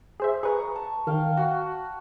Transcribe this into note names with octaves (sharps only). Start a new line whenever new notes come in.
G#4 C5 E5
G#4 B4 A#5 C#6
A5
D#3 F5 G5
F#4